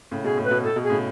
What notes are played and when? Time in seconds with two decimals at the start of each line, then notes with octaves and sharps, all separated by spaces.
0.11 A2 C#3
0.24 B2 G#4
0.38 A2
0.43 B4
0.51 B2
0.63 A2 A4
0.76 B2
0.83 G#4
0.90 A2 C#3